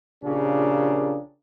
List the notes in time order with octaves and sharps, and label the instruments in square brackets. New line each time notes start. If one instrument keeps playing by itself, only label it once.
[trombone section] A#1 C#3 D4 F4 G4 A#4